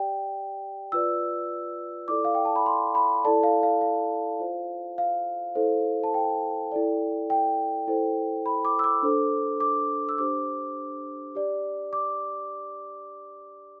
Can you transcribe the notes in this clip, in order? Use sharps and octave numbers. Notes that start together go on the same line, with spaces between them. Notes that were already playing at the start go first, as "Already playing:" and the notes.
Already playing: G4 D5 G5
F4 B4 D5 E6
E4 A4 D5 D6
F5
G5
A5
B5
C6
B5
E4 A4 D5 A5
F5
F5
F5
F4 C5
F5
E4 A4 C5
A5
G5
E4 A4 D5
G5
E4 A4 C5
B5
D6
E6
D6
D4 A4 C5
D6
E6
D4 G4 C5 D6
G4 D5
D6